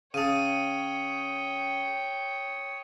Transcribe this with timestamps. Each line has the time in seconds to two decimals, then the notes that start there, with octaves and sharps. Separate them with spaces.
0.14 C#3 C#5 G5 A5 D#6 D#7